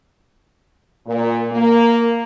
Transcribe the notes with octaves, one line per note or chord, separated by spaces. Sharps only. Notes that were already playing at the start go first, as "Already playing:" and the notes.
A#2
A#3